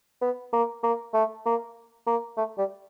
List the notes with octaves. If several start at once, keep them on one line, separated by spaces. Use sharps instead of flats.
B3
A#3
A#3
A3
A#3
A#3
A3
G3